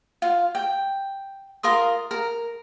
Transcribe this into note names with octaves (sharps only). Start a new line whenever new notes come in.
F4
G5
F4 A#4 C6 D#6
A#4